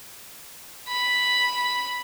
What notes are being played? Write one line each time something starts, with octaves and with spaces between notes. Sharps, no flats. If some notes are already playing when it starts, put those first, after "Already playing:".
B5